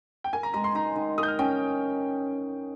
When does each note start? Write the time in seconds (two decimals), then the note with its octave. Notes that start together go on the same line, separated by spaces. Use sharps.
0.24 G5
0.33 A#4 G#5
0.43 A#5
0.54 G#3 A#5
0.64 C6
0.75 D#4 A#5
0.96 D#3
1.18 A#4 D#6
1.23 G6
1.28 F6
1.39 C#4 G5